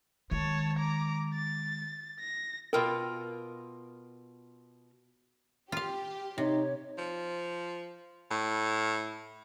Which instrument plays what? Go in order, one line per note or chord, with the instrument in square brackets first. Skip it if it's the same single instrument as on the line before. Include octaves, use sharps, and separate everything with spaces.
[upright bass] D#3 G#3 [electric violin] C#5 A5
[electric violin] A#5 D6
A6
A#6
[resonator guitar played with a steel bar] B2 F4 G5 [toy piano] A#4
[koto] F4 F5 [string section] G4
[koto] C3 [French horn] D#4 [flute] C#5
[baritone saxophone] F3
A2